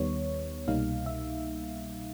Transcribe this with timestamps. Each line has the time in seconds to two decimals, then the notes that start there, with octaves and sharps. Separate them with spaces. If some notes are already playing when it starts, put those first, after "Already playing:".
Already playing: D#2 D#3 G3 B3 C#5
0.68 C2 B2 G3 A#3 D#4 F5
1.06 E5